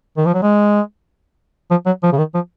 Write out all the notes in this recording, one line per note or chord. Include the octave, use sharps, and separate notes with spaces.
D#3
F3
F#3
G#3
F3
F#3
F3
C#3
D#3
F3